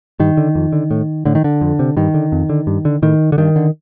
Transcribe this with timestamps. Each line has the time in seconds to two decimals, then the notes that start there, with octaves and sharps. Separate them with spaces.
0.19 G2 D#3
0.37 D3
0.55 F2
0.73 D3
0.91 A2
1.25 A2 D3
1.35 D#3
1.44 D3
1.61 F2
1.79 C3
1.97 G2 D#3
2.14 D3
2.32 F2
2.49 D3
2.67 G2
2.85 D3
3.02 A2 D#3
3.32 D3
3.38 G2 D#3
3.56 D3